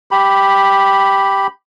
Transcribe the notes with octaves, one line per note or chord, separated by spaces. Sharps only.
G4 B5